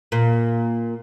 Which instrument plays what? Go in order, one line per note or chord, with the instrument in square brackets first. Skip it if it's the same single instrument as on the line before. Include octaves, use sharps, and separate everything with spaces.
[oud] A#2